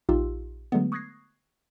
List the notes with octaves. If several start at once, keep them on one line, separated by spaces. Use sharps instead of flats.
A#1 D#4 F4 G4 C6 E6
D3 F#3 G#3 A3 B3
C#6 D#6 F#6 G#6 A#6 C7